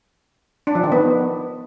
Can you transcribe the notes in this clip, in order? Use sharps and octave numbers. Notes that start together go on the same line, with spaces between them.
D4
F3
D#3
B3